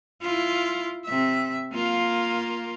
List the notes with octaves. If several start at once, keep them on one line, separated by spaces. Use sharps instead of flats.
E4 F4
C3 E5
A#3 F4